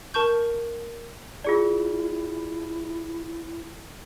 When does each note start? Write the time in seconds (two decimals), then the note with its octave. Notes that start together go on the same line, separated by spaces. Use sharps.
0.14 A#4 A5 C#6 G6
1.44 E4 F4 G#4 D5